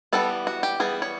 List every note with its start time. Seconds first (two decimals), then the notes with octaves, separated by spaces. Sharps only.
0.13 E3 G3 B3 A4
0.47 F#4
0.63 G4
0.80 E3 G3 B3 G#4
1.02 C#5